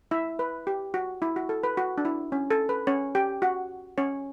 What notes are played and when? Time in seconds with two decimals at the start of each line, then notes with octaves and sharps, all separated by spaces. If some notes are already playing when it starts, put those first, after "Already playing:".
0.11 E4 E5
0.39 B4
0.67 G4
0.94 F#4
1.22 E4
1.36 F#4
1.49 A4
1.63 B4
1.77 F#4
1.98 D4
2.05 E4
2.32 C#4
2.50 A4
2.69 B4
2.87 C#4 C#5
3.15 G4 G5
3.42 F#4 F#5
3.98 C#4 C#5